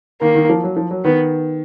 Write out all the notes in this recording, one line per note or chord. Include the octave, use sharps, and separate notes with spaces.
D#3 A#3
D#3
F3
F#3
F3
F#3
D#3 B3